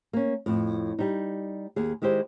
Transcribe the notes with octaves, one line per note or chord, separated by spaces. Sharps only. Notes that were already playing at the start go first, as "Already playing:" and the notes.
A#3 C#4
F2 A2
G3 D#4
D#2 G#4
D#3 G#3 E4 G4 C5